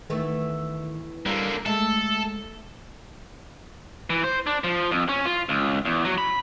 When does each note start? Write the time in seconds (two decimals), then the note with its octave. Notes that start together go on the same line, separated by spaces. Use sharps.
0.10 D#3 E3 A3 B3
1.26 D3 G3 A#3
1.66 G#3 A3 A4
4.10 E3
4.24 C5
4.47 D4
4.64 F3
4.91 F2
5.09 C#4
5.25 F4
5.49 C#2
5.85 E2
6.05 F#3
6.18 B5